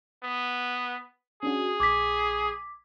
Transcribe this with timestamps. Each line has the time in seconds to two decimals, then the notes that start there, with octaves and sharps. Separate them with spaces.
0.23 B3
1.43 C#4 D4 F#4 G#4
1.80 A#1 D6 G#6 B6